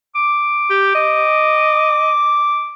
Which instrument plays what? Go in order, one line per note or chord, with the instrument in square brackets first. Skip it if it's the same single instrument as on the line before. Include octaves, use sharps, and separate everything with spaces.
[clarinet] D6
[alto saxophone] G4
D#5